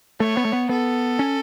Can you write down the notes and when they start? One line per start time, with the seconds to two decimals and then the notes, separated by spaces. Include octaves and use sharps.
0.20 A3 C#5
0.37 B3
0.45 A3
0.53 B3
0.69 B3 A4
1.19 C#4